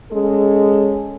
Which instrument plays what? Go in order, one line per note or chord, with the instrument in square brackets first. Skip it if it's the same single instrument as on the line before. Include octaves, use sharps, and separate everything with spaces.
[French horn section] G#3 C#4 A4